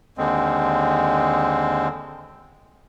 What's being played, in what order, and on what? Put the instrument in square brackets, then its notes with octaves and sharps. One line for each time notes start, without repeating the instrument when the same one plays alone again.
[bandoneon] D#2 D3 G#3 C4